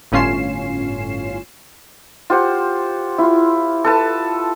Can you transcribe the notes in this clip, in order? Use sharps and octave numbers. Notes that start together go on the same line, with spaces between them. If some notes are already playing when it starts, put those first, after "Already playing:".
G1 A2 C#4 F4 C7 E7
F4 G4 C5 F#5
E4 F4
A4 B4 A5